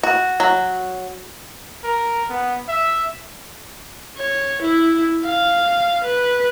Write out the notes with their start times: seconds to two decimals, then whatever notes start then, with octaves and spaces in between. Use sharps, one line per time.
0.03 F#4
0.40 F#3
1.84 A#4
2.29 B3
2.68 E5
4.17 C#5
4.62 E4
5.25 F5
6.04 B4